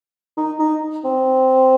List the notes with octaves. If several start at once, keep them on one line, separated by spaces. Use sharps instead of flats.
D#4
D#4
C4